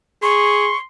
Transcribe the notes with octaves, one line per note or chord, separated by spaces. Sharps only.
G#4 C6 C#6